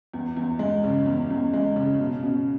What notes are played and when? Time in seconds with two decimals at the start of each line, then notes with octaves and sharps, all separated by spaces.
0.14 E2
0.37 E2
0.59 G#3
0.84 C#3
1.06 E2
1.30 E2
1.53 G#3
1.76 C#3
2.00 B2
2.23 B2